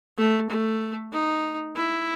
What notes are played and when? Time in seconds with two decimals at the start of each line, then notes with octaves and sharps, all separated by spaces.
0.18 A3
0.49 A3
1.12 D#4
1.76 E4